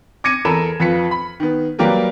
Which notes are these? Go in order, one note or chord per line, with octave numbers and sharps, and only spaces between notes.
D6 G#6 A#6 C#7 D#7
E2 A4 A#4 B5 E7
F2 F4 B4 B6 C#7
B5
D#3 B3
F#3 G3 A#3 G4 A#4 B4